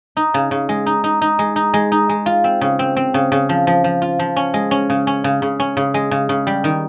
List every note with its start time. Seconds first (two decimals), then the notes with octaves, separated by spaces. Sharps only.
0.17 D#4
0.34 C#3
0.51 C#3
0.69 G#3
0.86 D#4
1.04 D#4
1.22 D#4
1.39 G#3
1.56 D#4
1.74 G#3
1.92 D#4
2.09 G#3
2.26 F4
2.44 C4
2.61 C#3
2.79 C4
2.96 C4
3.14 C#3
3.32 C#3
3.49 F3
3.67 F3
3.84 F3
4.02 F4
4.19 F3
4.36 C#4
4.54 G#3
4.71 C#4
4.90 C#3
5.07 C#4
5.24 C#3
5.42 C#3
5.60 C#4
5.77 C#3
5.94 G#3
6.11 C#3
6.29 C#3
6.47 G3
6.64 D#3